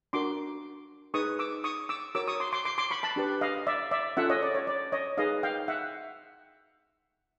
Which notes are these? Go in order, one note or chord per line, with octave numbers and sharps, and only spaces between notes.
D4 F#4 A#4 C6 D6
D#4 G#4 B4 C#6 D#6
D6 E6
C#6 D#6
D6 E6
F#4 A#4 C#5 D6 E6
C#6 D#6
C6 D6
C6 D6
C6 D6
C6 D6
B5 C#6
A5 B5
D4 G4 B4
D#5 F5
D5 E5
D5 E5
C#4 F4 A4 E5 F#5
C#5 D#5
D5
C#5
D5
C#5 D#5
D#4 G#4 B4 D#5 F5
F5 G5
E5 F#5